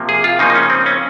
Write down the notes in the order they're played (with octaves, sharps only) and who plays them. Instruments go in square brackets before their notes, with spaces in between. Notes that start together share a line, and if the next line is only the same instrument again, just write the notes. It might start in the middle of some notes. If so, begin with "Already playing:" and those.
Already playing: [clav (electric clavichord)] C3 F3 A#3
G#4
F4
C#3 F3 A#3 D#4
D#4
C#4
C4
C#4